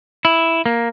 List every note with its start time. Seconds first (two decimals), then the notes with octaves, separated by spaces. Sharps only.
0.25 E4
0.66 A#3